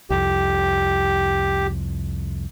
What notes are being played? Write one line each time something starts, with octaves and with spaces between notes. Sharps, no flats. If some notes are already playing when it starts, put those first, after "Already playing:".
C2 F2 G4